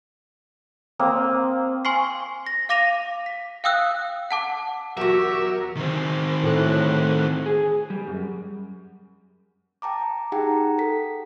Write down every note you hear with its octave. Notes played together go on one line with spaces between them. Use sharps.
A#3 C4 D#6
G#5 C6 C#6 F6 C7
A#6
F5 D6 A#6 D#7 F7
B6
F5 G5 D#6 E6 F#6
F#5 A5 D6
E2 F#3 F#4 G4 A#4 E5
D#3 C4
A2 F#6
G#4
G3
F#2
G5 A5 A#5 D6
D#4 G4 G#4 F#5 G5 A#5
A4 B6